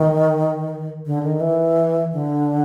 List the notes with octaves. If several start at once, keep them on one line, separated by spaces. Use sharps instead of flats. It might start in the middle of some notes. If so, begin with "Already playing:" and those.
Already playing: D#3
D3
D#3
E3
D3